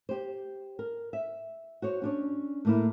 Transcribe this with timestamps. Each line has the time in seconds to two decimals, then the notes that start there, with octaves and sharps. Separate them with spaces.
0.09 G4 C5
0.79 A#4
1.13 E5
1.82 F#4 C5 C#5
2.02 C#4 D4 C#5
2.65 A2 A#3 E4